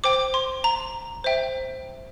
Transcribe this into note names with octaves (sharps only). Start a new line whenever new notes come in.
C5 G5 D6
C6
A#5
C5 E5 G5